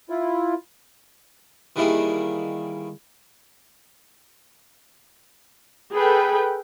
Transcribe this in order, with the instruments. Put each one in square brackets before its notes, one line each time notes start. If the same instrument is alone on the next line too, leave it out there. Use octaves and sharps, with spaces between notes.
[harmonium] E4 F4
[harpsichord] D#3 E3 G3 A#3 E4 G#4
[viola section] G#4 A4 B4 G5